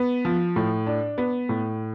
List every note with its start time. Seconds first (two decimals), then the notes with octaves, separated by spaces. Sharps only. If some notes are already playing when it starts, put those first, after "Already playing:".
Already playing: B3
0.25 F3
0.56 A2
0.86 D4
1.18 B3
1.49 A2